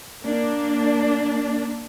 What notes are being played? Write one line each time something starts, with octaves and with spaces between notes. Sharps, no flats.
A#3 D4